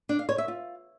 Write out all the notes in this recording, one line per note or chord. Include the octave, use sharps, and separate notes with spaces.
D4
F5
C#5
E5
F4